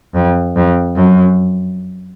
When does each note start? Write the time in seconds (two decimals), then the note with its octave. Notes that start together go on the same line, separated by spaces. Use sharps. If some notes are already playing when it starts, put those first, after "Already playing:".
0.15 F2
0.56 F2
0.96 F#2